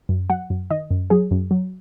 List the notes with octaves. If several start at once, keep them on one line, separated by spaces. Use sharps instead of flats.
F#2
F#3 F#5
F#2
D#3 D#5
F#2
F#3 G#4
F#2
F#3